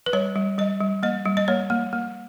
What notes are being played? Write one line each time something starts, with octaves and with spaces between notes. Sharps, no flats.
B4
G3 C#5
G3
G3 D#5
G3
A#3 D#5
G3
D#5
A#3 C#5
A#3
A#3